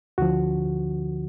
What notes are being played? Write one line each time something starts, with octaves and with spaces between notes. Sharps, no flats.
D2 D3 F3 F#4